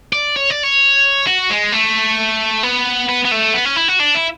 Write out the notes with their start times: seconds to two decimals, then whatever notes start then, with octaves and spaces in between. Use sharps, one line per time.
0.13 D5
0.36 C#5
0.50 D5
0.63 C#5
1.27 F#4
1.50 G#3
1.72 A3
2.63 B3
3.09 B3
3.25 B3
3.31 A3
3.54 B3
3.65 C#4
3.76 E4
3.88 F#4
4.00 D4
4.15 E4